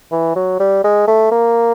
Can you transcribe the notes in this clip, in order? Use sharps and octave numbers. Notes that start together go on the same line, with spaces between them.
E3
F#3
G3
G#3
A3
A#3